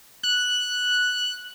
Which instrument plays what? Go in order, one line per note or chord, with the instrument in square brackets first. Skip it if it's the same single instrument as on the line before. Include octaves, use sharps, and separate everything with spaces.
[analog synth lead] F#6